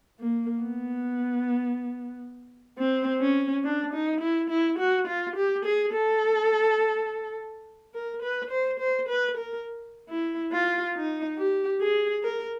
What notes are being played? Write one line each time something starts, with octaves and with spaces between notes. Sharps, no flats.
A#3
B3
C4
C#4
D4
D#4
E4
E4
F#4
F4
G4
G#4
A4
A#4
B4
C5
C5
B4
A#4
E4
F4
D#4
G4
G#4
A#4